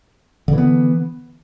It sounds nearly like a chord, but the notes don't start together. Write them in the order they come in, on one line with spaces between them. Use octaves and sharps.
D3 E3 B3